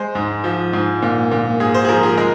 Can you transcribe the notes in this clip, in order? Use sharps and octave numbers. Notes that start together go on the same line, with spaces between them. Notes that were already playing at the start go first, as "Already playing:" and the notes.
Already playing: G#3 C5
G#2
F3
G#2
A#2
A#2
G#2 G#4
C5
G#4
F3 A#4
G#4
G#3 A#4